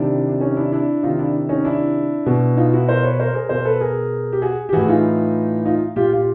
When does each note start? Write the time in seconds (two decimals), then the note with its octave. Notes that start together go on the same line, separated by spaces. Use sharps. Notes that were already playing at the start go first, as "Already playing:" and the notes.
Already playing: C3 D#3 D4 E4
0.30 D4
0.41 C#4 D#4
0.56 D4 E4
0.72 D4 E4
1.03 C3 D#3 D#4 F4
1.19 D4 E4
1.49 C#4 D#4
1.65 D4 E4
2.26 B2
2.57 D#4 F4
2.73 E4 F#4
2.88 A#4 C5
3.03 B4 C#5
3.19 A#4 C5
3.34 G#4 A#4
3.49 B2 A#4 C5
3.65 A4 B4
3.81 G#4 A#4
4.32 G4
4.42 F#4 G#4
4.69 G4
4.73 A2 E3 F#4 G#4
4.88 D#4 F4
5.65 D#4 F4
5.96 A#2 F4 G4
6.12 F4 G4